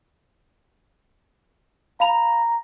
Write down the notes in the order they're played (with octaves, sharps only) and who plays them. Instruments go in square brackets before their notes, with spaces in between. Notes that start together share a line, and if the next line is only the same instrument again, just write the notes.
[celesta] F5 B5 F7 [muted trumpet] A#5